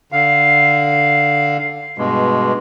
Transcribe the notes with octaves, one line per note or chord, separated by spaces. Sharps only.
D3 F5
G2 B2 G#3